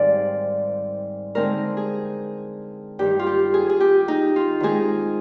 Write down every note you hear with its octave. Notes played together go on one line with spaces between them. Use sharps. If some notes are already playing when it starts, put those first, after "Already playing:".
Already playing: G#2 D#3 G3 C4 D5 F5
D3 G#3 C4 D#4 A#4
G#4
G2 D#3 G3 G4
F4
G4
G#4
G#4
G4
D#4
F4
D#3 G#3 C4 D#4 G#4